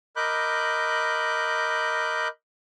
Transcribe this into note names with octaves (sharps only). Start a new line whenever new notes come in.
A#4 D#5 B5 D6 F#6 G6